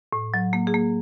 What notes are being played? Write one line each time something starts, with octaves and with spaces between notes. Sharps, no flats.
A2
F#3
A#3
G#4
A#3